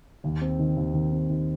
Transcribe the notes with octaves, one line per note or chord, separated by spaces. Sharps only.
D#2
C4
D#3
D#2
D#3
C4
D#3